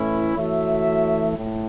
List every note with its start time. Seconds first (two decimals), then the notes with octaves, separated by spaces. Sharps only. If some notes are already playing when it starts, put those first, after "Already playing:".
Already playing: A2 E3 A3 C#4 E4
0.35 E3 A3 F#4 C#5 E5
1.37 A2